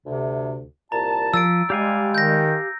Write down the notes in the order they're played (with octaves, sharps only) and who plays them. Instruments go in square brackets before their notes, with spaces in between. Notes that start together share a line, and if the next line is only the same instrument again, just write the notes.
[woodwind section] D2 C3
[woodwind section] C2 A#2 A5 [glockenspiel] A#5
[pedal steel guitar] F3 [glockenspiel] E6 A6 D7
[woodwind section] G3 G#3 [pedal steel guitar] G4 F5 G#5
[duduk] D#3 [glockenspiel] G6 A#6